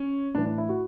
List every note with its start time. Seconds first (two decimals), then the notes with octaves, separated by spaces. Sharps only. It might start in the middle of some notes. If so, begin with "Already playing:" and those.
Already playing: C#4
0.35 A2 D4
0.38 E3
0.46 D4
0.58 E4
0.69 F#4